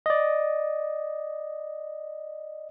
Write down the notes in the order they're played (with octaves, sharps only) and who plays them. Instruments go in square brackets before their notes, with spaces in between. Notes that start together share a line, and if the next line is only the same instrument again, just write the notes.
[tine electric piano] D5 D#5